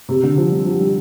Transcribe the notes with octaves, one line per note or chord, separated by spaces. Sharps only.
C3
D3
F3
G3
F3
G3